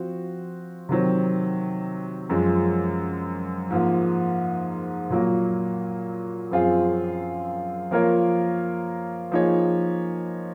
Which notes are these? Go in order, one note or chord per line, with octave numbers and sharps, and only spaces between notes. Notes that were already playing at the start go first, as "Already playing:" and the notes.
Already playing: F3 C4 F#4
C3 D#3 F#3 C4
F#2 F3 G#3
G#2 F3 A#3
A#2 F#3 A#3
F#2 F3 C4 F4 G#4
F3 A#3 F4 A#4 C#5
F3 A#3 D#4 G#4 C#5